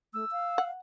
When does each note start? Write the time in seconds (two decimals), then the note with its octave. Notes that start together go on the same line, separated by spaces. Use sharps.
0.14 A3 E6
0.32 F5
0.58 F#5